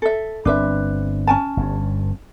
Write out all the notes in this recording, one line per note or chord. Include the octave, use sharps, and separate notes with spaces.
A4 E5
G1 C4 D4 B4 E5
C#4 G#5 A5
G1 G2